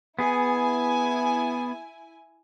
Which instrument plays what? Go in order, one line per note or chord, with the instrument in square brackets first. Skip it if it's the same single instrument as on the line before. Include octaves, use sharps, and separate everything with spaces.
[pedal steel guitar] B3 G#4 [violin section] E4 G#5